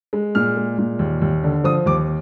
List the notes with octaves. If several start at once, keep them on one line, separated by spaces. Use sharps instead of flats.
G#3
A#2 F6
G#3
A#2
D#2
D#2
D3
F3 D#6
D#2 D6